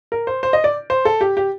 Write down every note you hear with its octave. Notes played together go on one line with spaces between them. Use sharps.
A#4
C5
C5
D#5
D5
C5
A4
G4
G4